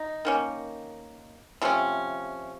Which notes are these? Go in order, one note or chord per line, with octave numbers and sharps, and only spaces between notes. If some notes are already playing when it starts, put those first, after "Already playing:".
Already playing: D#4
D#3 A#3 C#4
C3 F3 A3 C#4